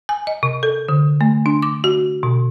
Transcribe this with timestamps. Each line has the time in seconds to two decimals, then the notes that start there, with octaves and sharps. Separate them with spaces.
0.09 G#5
0.27 D#5
0.43 C3
0.63 A4
0.89 D3
1.21 A3
1.46 D4
1.63 D6
1.84 F#4
2.23 B2